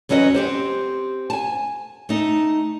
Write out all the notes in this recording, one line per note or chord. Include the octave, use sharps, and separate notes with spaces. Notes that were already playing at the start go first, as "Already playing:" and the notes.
E2 F#3 C#4 B4 D#5
C4 G4 C5
G#5 A5
A3 D#4